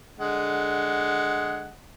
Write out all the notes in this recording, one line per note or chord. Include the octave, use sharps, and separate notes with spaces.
D3 G#3 F#5